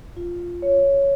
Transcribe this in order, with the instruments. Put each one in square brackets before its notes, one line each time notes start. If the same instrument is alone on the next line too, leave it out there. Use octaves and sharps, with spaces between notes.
[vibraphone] F4
C#5